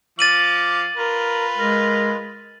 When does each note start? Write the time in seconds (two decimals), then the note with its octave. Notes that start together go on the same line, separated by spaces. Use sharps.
0.19 F3 F5 D6 A6 D#7 F#7
0.97 F4 A#4 B4
1.58 G#3 A#4